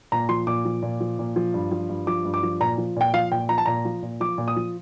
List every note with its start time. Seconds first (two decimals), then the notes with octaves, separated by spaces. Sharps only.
0.12 A#2 A#5
0.29 F3 C6
0.47 A#2 D6
0.65 F3
0.83 A#2
1.00 F3
1.19 A#2
1.36 F3
1.54 G2
1.71 F3
1.89 G2
2.07 F3 D6
2.25 G2
2.34 D6
2.43 F3
2.60 A#2 A#5
2.78 F3
2.96 A#2 G5
3.13 F3 F5
3.32 A#2 G5
3.49 F3 A#5
3.58 A5
3.66 A#2 A#5
3.85 F3
4.02 A#2
4.20 F3 D6
4.38 A#2
4.48 D#6
4.56 F3